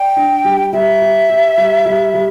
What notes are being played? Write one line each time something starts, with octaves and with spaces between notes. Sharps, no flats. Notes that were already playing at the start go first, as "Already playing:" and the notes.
Already playing: D5 G5
D4
G3
G3 E5
G4
G4
G3
G3
G3